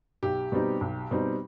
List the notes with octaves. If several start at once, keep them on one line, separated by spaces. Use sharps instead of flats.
B1 G4
B2 G3 C4 D#4
B1
B2 G3 C4 D#4